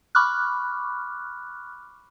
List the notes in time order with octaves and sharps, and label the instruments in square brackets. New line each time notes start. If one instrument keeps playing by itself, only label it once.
[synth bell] B5 C#6 D6 F6 F#6